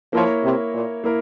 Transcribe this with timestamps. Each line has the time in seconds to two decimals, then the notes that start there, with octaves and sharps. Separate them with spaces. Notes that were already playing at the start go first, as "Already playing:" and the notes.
0.13 F3 A#3 E4 A#4 C#5
0.43 C3
0.73 A#2
1.04 A#3 E4 A#4